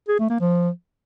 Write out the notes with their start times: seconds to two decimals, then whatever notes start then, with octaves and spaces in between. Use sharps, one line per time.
0.09 G#4
0.19 A3
0.30 A#3
0.40 F3